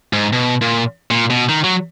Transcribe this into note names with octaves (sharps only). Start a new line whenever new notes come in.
G#2
B2
A#2
A#2
B2
D#3
F#3